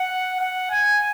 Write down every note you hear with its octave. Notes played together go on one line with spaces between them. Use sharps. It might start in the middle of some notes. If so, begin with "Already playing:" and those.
Already playing: F#5
F#5
G#5